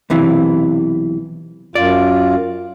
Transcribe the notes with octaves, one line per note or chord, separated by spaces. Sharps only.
B1 C3 E3
F#2 F4 D5